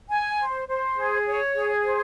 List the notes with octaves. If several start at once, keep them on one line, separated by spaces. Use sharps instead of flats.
G#5
C5
C5
G#4
C#5
G#4
C5